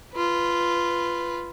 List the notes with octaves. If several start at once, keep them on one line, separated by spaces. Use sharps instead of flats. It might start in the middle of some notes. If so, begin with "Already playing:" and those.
F4 B4